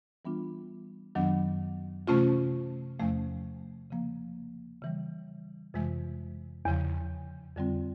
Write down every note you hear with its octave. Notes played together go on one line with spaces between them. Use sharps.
E3 G3 B3 D4 F4
F#2 D#3 F#3 B3 D4
C3 E3 A3 C#4 F4
E2 C3 F3 A3 C#4
C#3 F3 A#3
C#3 E3 G3
F2 C3 E3 G#3
E2 C#3 F3
F2 D3 G3 C4 F4